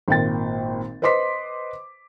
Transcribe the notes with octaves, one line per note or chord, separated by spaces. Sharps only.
G#1 A#2 G5 A6
B4 C5 D#5 C6 D6 B6